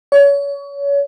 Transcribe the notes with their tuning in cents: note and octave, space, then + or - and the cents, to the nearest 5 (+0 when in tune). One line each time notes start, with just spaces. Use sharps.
C#5 +30